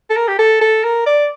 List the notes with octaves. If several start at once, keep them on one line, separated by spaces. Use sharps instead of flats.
A4
A#4
G4
A4
A4
A#4
D5